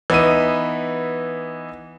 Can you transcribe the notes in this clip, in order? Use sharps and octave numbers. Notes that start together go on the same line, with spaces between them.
E3 B3 D#4 E5 D#7